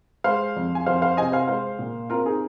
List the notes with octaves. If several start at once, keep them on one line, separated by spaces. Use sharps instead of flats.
G#3 C5 F5
F2
G#5
F2 C5 F5
C5 F5
C3 D#5 G#5
C5 F5
G#3 C5 F5
A#2
C4 F4 A#4
D#4 G#4